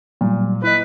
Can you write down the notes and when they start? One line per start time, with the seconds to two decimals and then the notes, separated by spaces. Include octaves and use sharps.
0.21 A#2 F#3 G3
0.64 E4 B4 D#5